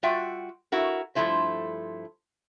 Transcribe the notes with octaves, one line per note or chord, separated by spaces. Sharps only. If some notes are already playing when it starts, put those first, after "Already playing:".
G3 F4 F#4 E5 G5
E4 F#4 A#4
G2 C3 F3 A3 E4 C5